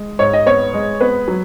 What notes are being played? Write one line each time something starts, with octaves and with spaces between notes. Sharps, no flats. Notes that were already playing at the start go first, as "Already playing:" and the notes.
Already playing: G#3
G#2 C#5
D#5
B3 C#5
G#3
B3 B4
F#3